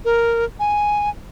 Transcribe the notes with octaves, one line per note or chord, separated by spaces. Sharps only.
A#4
G#5